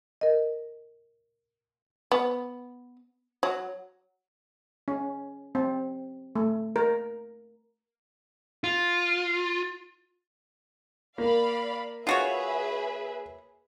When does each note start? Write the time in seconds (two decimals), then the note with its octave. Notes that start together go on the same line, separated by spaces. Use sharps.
0.21 A#4 D#5
2.12 B3
3.43 F#3
4.88 C#4
5.55 C4
6.36 A3
6.76 A#4
8.64 F4
11.18 A#3 D5 F5 B5
12.07 F4 F#4 G#4 B4 C#5 E5